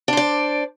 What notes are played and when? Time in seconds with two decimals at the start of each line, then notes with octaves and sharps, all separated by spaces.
0.08 D4
0.13 C5
0.17 D5